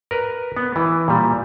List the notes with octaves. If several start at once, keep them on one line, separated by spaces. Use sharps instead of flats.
A#4 B4
B3
E3
A#2 G3